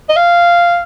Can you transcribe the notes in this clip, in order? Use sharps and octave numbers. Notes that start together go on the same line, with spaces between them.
D#5
F5